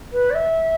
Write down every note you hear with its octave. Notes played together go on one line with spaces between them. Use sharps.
B4
D5
E5